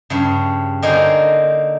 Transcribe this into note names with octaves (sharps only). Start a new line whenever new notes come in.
G2 C#3
D3 A#3 D#4 G#4 C5 D#5